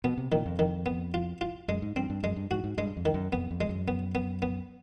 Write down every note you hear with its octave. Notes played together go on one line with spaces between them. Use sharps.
B2 B3
C3
A#2 D#3
F2
D#3
B3
F4
F4
F#2 G#3
G#2
G2 C4
G2
F#2 G#3
G2
G#2 F#4
G#2
G2 G#3
F2
D#3
F#2
F2 B3
F2
G#3
F#2
B3
B3
B3